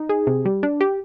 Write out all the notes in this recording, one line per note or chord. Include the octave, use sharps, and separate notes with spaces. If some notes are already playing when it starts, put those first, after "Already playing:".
Already playing: D#4
G#4
C3
G3
D4
G4